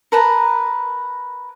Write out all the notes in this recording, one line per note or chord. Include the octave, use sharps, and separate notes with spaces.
A#4 B4 A5 A#5